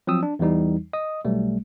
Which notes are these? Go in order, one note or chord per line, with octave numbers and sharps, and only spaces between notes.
F3 F#3 C4 D#6 E6
D4
E2 E3 G3 D#4
D#5 D#6
B1 G3 A3